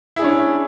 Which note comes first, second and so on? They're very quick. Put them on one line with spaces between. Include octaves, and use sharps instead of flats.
E4 G#4 D4 C#4